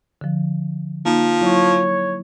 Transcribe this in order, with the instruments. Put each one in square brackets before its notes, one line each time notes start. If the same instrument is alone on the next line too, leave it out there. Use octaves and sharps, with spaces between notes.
[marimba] D3 F3
[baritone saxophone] F3 [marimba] A#3 D#4
[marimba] F#3 E4 [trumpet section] C#5